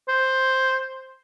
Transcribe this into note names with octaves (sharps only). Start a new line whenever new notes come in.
C5